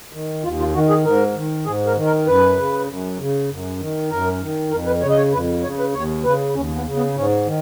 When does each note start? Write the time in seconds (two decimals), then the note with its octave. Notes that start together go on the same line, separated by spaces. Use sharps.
0.13 D#3
0.43 D#2 F4
0.59 F4
0.74 D#3 F#4
0.89 G#4
1.04 G#2 A#4
1.35 D#3
1.66 G#2 G#4
1.87 A#4
1.97 D#3
2.06 A#4
2.27 F#2 B4
2.58 C#3
2.88 F#2
3.19 C#3
3.50 F#2
3.79 D#3
4.11 F#2 A#4
4.42 D#3
4.71 F2 A#4
4.86 B4
5.02 C#3 C#5
5.10 D#5
5.18 C#5
5.33 F2 B4
5.63 C#3 C#5
5.79 B4
5.94 D#2 C#5
6.24 C#3 B4
6.55 D#2 C#4
6.76 B3
6.85 C#3
6.96 B3
7.17 G#2 C#4
7.46 D#3